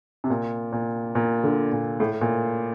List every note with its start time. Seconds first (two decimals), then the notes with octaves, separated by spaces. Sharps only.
0.24 C3
0.30 A#2
0.72 A#2
1.15 A#2
1.44 D3
1.72 A#2
2.00 A2
2.21 A#2